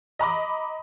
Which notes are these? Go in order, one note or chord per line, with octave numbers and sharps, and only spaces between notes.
D#5 A#5 B5 D6